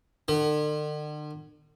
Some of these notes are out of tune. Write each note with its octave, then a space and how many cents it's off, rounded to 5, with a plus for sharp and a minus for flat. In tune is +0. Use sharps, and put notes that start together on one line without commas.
D3 +45